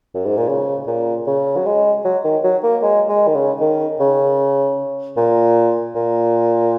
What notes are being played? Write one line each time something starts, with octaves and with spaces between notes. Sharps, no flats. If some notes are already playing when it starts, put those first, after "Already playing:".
F#2
G#2
A#2
C#3
A#2
C#3
F#3
G#3
F#3
D#3
F#3
A#3
G#3
G#3
D#3
C#3
D#3
C#3
A#2
A#2